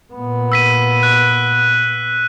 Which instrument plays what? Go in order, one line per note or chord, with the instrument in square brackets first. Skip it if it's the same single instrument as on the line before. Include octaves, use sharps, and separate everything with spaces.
[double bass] A#2 B3
[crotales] E6 B6 D#7
F#6